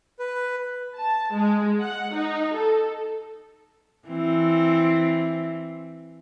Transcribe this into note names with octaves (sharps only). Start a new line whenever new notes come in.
B4
A5
G#3
F#5
D#4
A4
E3 C4